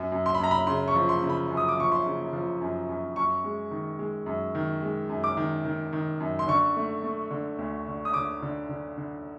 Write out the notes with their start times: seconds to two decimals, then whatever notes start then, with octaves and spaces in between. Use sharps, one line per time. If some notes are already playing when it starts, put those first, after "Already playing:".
Already playing: F#2
0.12 F#2
0.26 C6
0.35 B5
0.40 F#2 A#5
0.51 B5
0.67 C#3 C6
0.88 C#6
0.95 F3
1.09 C6
1.22 C#3
1.30 B5
1.51 F#2
1.57 D#6
1.68 D6
1.77 F3 C#6
1.92 C6
2.06 C#3
2.33 F3
2.61 F#2
2.89 F#2
3.16 F#2 C#6
3.44 G#3
3.71 D#3
3.99 G#3
4.26 F#2
4.55 D#3
4.82 G#3
5.09 F#2
5.24 D6
5.37 D#3
5.65 D#3
5.93 D#3
6.20 F#2
6.39 C6
6.48 D3 C#6
6.76 A3
7.03 A3
7.31 D3
7.59 D2
7.87 D3
8.05 D#6
8.14 D3 D6
8.42 D3
8.69 D3
8.98 D3